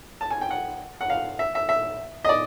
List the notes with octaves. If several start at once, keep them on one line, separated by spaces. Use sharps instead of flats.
A5
G#5
G5
F#5
F#5
F5
E5
E5
E5
D#5
D5